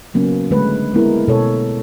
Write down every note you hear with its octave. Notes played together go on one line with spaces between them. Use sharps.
C#3 F#3 A#3 B3 C#4
D3 G#3 A3 B4
G#3 A#3 B3 E4 A#4
B2 A4 C#5